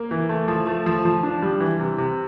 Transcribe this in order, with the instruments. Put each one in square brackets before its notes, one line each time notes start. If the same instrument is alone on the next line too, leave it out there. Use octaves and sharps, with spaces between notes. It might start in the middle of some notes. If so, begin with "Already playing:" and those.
Already playing: [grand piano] A#3
E3
A3
F3
A3
F3
F3
D4
G3
E3
C3
C3